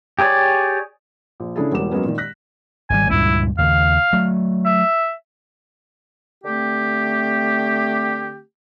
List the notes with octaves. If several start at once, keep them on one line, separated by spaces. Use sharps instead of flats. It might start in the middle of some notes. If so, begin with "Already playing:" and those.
G4 G#4 A#4 C#5 D5
A#1
C#3 D4 E4 G#4 A4
E1 E2 G3 A#3 D6 E7
F#3 G#3 A#3 B3 C#4
A#2 D#3
F#6 A#6 B6
G#1 C#3 G3 G#5
C#2 G2 A#2 E4
D#2 C#3 F5
F#3 A3
E5
D3 A3 C4 G4